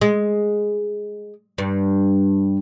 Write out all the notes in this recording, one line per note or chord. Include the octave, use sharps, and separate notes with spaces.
G#3
G2